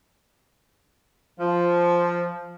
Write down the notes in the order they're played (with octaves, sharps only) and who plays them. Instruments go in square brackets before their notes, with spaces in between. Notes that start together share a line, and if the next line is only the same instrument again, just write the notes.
[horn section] F3